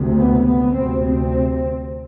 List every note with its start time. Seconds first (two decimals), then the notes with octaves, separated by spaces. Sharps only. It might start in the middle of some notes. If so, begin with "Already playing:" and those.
Already playing: D2 C3
0.15 B3
0.44 B3
0.73 D2 C3 C4
1.02 C4